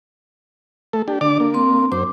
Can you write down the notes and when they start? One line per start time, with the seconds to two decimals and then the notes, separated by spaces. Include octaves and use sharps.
0.93 A3 A4
1.08 D4 G4
1.21 D3 D4 D5 D6
1.40 A#3
1.54 C4 C6
1.92 F#2 C5 D6